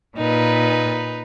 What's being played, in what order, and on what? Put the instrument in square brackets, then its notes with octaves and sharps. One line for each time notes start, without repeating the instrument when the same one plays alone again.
[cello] A#2 [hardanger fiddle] D#4 B4